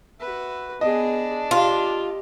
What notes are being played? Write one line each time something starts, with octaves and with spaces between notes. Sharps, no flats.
F#4 B4 E5
B3 D4 G#4 D#5
F4 G4